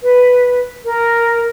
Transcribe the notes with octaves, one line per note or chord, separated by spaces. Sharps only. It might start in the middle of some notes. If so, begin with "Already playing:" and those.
B4
A#4